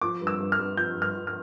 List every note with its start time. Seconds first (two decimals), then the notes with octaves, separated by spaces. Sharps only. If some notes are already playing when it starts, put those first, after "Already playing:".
0.01 F3 D6
0.21 G2
0.27 E6
0.39 G2
0.52 F6
0.59 G2
0.77 F3 G6
0.95 G2
1.02 F6
1.15 F3
1.27 F6